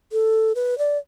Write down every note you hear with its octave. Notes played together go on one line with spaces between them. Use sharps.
A4
B4
D5